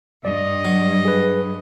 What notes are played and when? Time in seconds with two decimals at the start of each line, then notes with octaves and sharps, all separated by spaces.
0.25 G2 D5 D#5
0.65 F#3
1.05 G#4 B4